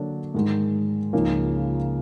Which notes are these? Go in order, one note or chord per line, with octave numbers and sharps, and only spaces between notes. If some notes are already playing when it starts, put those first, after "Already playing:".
Already playing: D3 F#3 A#3 D4
G#2 D#3 G#3
C#2 C#3 F3 A#3 D#4